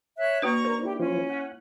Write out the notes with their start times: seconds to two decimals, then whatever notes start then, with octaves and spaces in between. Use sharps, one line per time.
0.18 C#5 E5 F#6
0.42 A#3 D4 F#4 B4 A#5 C#6
0.65 A#4 C5
0.83 E4 G4
0.99 F3 C#4 F4 C5
1.30 F#5